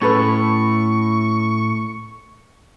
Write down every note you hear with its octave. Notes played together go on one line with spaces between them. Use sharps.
A2 C#4 A4 B4 C#6